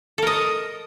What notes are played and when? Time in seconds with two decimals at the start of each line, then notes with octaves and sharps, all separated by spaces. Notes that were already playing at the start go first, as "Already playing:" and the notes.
0.18 A4
0.22 A#4
0.27 D#5